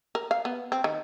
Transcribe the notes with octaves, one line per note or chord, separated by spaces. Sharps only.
A#4
F5
B3
C4
D#3